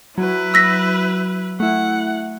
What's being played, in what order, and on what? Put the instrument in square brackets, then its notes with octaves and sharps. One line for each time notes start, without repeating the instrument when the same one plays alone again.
[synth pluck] F#3 [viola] E4 B4
[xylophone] E6 A#6 B6
[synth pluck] A3 E4 [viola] F#5